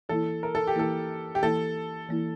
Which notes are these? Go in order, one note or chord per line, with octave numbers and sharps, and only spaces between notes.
E3 A#3 E4 A4
A#4
A4
G4
E3 A#3 E4 A4
G4
E3 A#3 E4 A4
E3 A#3 E4